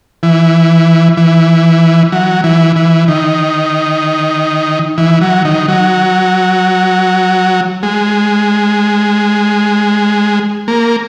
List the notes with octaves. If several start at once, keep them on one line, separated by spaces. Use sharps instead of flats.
E3
E3
F#3
E3
E3
D#3
E3
F#3
D#3
F#3
G#3
A#3